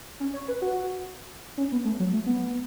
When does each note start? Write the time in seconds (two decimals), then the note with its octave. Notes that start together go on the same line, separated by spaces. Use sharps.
0.20 C#4
0.33 C#5
0.48 B4
0.62 F#4
1.58 C#4
1.72 B3
1.85 A3
2.00 F#3
2.13 A3
2.26 B3